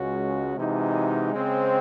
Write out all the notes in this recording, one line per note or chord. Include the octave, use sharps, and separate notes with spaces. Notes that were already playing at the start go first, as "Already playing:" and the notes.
Already playing: C#2 C#3 G#3 C#4 F#4
C3 E3 G#3 D#4 F#4
C#3 G#3 C4